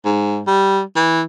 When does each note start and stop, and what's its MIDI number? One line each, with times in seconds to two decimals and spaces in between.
0.05 0.42 44
0.47 0.81 55
0.96 1.22 52